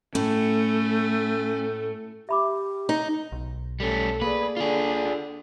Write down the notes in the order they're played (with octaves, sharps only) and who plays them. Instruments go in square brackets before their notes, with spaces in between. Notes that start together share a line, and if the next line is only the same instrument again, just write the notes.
[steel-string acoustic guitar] A2 [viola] A3 [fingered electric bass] C#4
[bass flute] G4 [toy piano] E5 B5 D6
[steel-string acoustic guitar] D#4
[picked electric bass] B1
[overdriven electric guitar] G3 C#4 [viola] A3 A4
[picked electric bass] A#3 [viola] G#4 D5 [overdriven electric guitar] B4
[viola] D3 D5 [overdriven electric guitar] F4 G#4